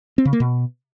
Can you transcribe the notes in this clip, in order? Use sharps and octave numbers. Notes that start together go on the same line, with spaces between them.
C4
C#3
A#3
B2